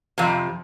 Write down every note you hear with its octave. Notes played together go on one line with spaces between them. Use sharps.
F2 C3